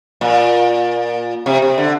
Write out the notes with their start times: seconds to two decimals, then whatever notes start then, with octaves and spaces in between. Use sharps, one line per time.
0.21 A#2
1.46 C3
1.62 C3
1.78 D3